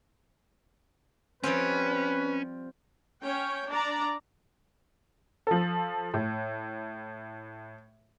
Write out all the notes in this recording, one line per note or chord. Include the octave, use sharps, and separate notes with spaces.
F3 G3 C4 C#4 B4
C#4 C#5 G5
D4 D5 A#5
F3 A4
A2